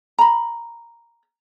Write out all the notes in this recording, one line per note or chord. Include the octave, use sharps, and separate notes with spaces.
A#5 B5